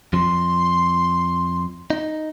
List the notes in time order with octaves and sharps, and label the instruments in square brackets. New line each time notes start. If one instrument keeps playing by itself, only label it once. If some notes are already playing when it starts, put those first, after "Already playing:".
[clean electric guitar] F2 F3 [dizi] C6
[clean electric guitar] D#4